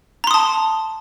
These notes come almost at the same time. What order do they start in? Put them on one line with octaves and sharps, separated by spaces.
A#5 C6 D#6 A5